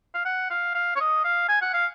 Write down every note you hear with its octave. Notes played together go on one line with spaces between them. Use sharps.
F5
F#5
F5
F5
C#5
D#5
F5
G#5
F#5
F5